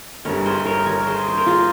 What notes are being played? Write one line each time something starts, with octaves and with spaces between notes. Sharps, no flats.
G1 G2 G3 A#4 C#5
G#4 C5
A#4 C#5
A#4 C#5
G#4 C5
C5
A#4
F4 G#4